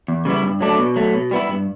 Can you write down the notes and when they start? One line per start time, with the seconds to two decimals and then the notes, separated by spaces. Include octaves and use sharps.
0.08 E2
0.25 C#3 G3 B3 E4
0.43 G2
0.61 F#3 A3 D4
0.78 B2
0.96 F#3 A3
1.14 B2
1.31 G3 B3 E4
1.48 G2